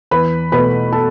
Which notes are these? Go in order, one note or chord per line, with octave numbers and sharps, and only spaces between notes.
E2 B4 B5
B2 A3 B4 B5
A4 A5